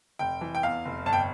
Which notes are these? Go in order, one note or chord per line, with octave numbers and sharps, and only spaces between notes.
F1 G5
E3
G5
E2 F5
F1
G1 A5
G5